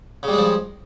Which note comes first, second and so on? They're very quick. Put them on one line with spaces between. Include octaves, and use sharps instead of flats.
C#3 G3 G#3 F3